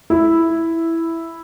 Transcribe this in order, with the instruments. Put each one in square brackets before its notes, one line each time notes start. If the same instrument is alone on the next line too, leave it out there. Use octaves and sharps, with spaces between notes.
[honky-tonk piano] E4